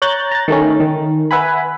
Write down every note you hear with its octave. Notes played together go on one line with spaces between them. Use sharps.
C#5 A#5 F#6 G6 A6
A#5 A6
D#3 A3 C#4
D#3
B4 E5 F#5 G#5 B5